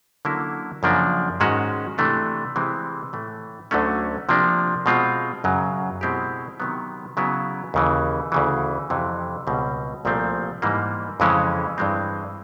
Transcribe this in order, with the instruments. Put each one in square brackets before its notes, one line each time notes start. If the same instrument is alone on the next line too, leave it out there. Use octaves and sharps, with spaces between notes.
[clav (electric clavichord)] D3 F#3 A#3 C#4 E4
F#2 C#3 F3 A#3 D4
G#2 D#3 G#3 C#4 F#4
C3 E3 A3 D4
C3 E3 G#3 C4
A2 E3 A3
D2 D3 F#3 A3 C#4
C3 F3 A#3 D4
B2 G#3 C4 F4
F#2 C#3 F#3
B2 G#3 C4 E4 G4
C3 D#3 F#3 B3
C#3 F#3 B3 E4
D#2 C#3 E3
D2 C#3 E3
F2 C3 E3
C#2 B2 G3 C4
C2 A#2 F3 A3 C4
G#2 E3 G3 A#3
F2 C#3 E3 G#3 C#4
G2 E3 G#3 C4